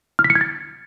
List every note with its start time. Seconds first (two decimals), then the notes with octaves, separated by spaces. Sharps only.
0.19 F6
0.24 B6
0.30 C#7
0.35 G#6
0.41 A6